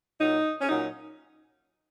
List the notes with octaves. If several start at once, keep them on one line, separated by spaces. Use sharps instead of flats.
A#2 F#3 D#4
C#4
A#2 F#3 D#4